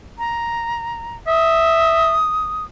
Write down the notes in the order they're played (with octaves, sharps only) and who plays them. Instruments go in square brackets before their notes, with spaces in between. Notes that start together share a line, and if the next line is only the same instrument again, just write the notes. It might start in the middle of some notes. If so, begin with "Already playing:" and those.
[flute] A#5
[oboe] E5 [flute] D#6